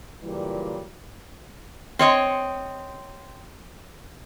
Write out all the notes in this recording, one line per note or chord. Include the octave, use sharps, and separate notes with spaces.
A#2 C#3 E3 F#3 G3
C4 C#5 D#5